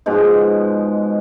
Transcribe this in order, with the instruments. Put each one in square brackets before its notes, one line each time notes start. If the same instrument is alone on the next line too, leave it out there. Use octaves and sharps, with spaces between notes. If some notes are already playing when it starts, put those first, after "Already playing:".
[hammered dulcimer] G#2 B2 F3 G#3